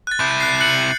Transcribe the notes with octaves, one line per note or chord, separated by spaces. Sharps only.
F#6 A6
C3 E4 G6
F#6 C7
F#6 C#7 F#7